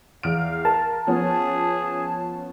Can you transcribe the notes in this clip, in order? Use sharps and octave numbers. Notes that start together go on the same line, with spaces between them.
E2 F5 F6 D7
A#4 A5
F3 B3 C#4 G#4